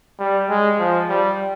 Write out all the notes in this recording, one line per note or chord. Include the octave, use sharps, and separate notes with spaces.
G3
G#3
F3
G3